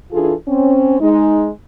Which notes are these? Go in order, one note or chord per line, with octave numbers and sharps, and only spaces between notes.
E3 D4 F4 G#4 A4
C4 C#4
G#3 D#4